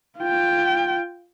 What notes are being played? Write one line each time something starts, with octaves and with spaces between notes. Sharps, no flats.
F4 G5